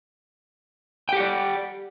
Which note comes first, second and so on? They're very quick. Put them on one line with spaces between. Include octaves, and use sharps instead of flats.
G5 G4 F#5 D5